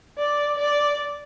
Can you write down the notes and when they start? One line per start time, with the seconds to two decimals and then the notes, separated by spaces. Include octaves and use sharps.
0.18 D5
0.58 D5